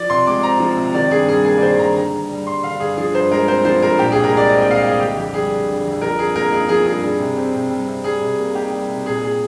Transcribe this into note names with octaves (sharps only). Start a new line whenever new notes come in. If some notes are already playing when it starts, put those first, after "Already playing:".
Already playing: F3 D5
C3 C6
G#3 D6
C4 A#5
F3
C3
D#3 D5
G2 G#4
G3 G#4
A#3 G#4
D5
D#3 C5
G2 A#5
D3 A#5
G2
G3
G2 C6
D3 F5
G2 G#4
F3 G#4
G2 C5
G#3 A#4
C4 C5
F3 C5
G2 A#4
A#2 G4
C2 G#4
A#4
G#3 D5
C4 D#5
G5
A#2 F5
D#5
C2 G#4
D3 G4
F2 G4
G3 G#4
D4
D3
F2
F3 A#4
G2 G#4
A#3 A#4
D#4 G#4
F3 G#4
G2 G#4
G3
C3
C4
C3
G3
C3
G3 G#4
C3
A#3
D#4 G4
G3
C3
A#2 G#4
G#4